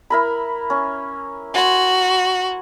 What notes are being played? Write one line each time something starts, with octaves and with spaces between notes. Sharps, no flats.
E4 A#4 B5
C#4
F#4 G#5 C6